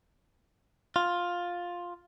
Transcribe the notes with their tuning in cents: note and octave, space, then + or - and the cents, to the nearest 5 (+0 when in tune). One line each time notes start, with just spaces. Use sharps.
F4 +10